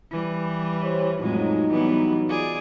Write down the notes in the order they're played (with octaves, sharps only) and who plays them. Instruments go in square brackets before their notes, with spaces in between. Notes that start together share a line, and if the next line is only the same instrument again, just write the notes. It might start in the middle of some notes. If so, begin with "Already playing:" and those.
[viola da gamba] E3 G3
[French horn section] G4 C5 C#5
[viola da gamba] F2 A2 G#3 [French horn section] F#3 D#4
[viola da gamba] E3 G3 B3
F4 G#4 D5